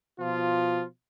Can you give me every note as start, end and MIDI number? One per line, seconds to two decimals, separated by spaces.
0.19 0.85 47
0.19 0.85 53
0.19 0.85 65